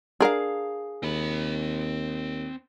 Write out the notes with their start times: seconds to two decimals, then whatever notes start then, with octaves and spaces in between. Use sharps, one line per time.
0.21 D4 G#4 A#4 F5
1.03 D#2 C4 B5